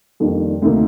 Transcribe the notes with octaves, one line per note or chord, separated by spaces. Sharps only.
F2 D#3 G3 A#3 D4
D2 C3 D#3 A#3